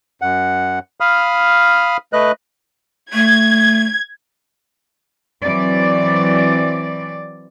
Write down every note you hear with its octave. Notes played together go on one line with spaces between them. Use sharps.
F#2 F#5
F5 B5 D#6 F6
A3 B4 D#5 F#6
A3 G#6
E3 F#3 C4 D5